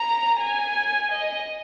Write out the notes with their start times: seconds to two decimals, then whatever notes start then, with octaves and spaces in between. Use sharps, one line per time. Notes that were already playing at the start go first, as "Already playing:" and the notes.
Already playing: A#5
0.40 G#5
1.11 D#5